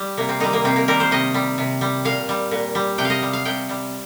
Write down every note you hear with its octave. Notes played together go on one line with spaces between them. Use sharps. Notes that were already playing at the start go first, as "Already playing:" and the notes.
Already playing: G3
C3 A#3
C4
D#3 G3 D#4
A#3
C3 C4
A#3
D#3 G3 A#4
C5
C3 D#5
G3
C3
G3
A#2 F5
G3
A#2
G3
C3 G5
D#5 F5
G3
F5
C3 G5
G3